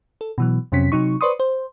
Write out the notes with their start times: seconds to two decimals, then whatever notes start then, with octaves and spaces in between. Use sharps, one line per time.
0.21 A4
0.38 B2 E3 F#3
0.72 F2 C3 F#3 C#4 B6
0.92 C3 F#3 D#4 C#6
1.21 B4 C5 D5 C6 C#6 D#6
1.40 C5